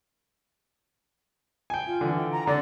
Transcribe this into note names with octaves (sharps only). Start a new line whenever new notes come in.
G5 G#5
F4
D3 E3
G5
A#5
D3 D5